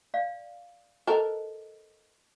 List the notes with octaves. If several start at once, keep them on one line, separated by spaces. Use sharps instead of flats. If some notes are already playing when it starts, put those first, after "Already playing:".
D5 F5
A4 A#4 C5 D#5